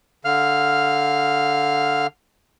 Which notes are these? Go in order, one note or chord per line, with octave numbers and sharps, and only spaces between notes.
D3 F5 F6